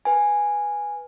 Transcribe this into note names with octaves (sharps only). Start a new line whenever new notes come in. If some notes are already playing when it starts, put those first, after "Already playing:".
B4 G#5